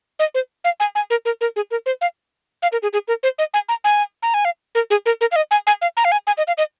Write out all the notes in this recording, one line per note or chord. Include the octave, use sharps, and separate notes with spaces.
D#5
C5
F5
G#5
G#5
A#4
A#4
A#4
G#4
A#4
C5
F5
F5
A#4
G#4
G#4
A#4
C5
D#5
G#5
A#5
G#5
A#5
G#5
F5
A#4
G#4
A#4
A#4
F5
D#5
G#5
G#5
F5
A#5
F5
G#5
G#5
D#5
F5
D#5